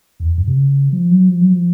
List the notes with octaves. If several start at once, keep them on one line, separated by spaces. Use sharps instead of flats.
E2
F2
F#2
C3
C#3
F3
F#3
F3
F#3
F3